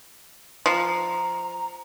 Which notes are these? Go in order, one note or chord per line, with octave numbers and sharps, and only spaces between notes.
F3 A#5